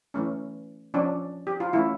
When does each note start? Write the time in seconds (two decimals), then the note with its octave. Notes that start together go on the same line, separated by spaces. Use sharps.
0.14 E3 A3 C#4
0.94 F3 C#4 D4
1.47 G4
1.60 F4
1.73 E3 A3 C#4 E4